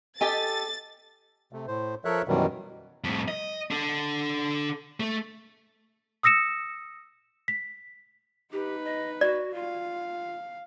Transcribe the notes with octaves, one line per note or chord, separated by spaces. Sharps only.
G4 A4 D#5 G#5 A6
C3 A3
A2 C5
F3 A4 A#4 C#5 E5 F#6
F#2 B2 D#3 E3 F#3 G3
F2 A2
D#5
D4 A4
A3
D#6 E6 A#6 C#7 E7
B6
D#4 G4 B4
D#5
F#4 D5
F4 F5